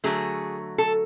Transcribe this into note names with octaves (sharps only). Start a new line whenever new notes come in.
D3 F#3 A3 G#4
A4